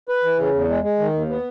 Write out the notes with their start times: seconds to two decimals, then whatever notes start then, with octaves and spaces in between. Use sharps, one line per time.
0.09 B4
0.24 E3
0.39 C#3
0.54 E2
0.69 G#3
0.83 G#3
0.99 D#3
1.14 D#2
1.29 B3